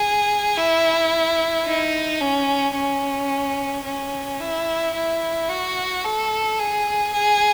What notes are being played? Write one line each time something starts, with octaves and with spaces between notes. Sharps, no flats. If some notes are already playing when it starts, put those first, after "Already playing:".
Already playing: G#4
E4
D#4
C#4
C#4
C#4
E4
E4
F#4
A4
G#4
G#4